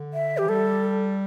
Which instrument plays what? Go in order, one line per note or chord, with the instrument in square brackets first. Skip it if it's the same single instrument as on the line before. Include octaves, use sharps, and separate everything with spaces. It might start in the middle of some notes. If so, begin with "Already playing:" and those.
Already playing: [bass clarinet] D3
[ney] E5
[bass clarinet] E3 [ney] G4
[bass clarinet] G3 [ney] A4